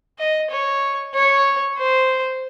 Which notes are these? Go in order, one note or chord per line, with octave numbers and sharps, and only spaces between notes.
D#5
C#5
C#5
C5